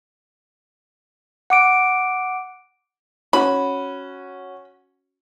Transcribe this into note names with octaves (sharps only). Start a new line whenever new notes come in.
F#5 D6 D7
C#4 F#4 B5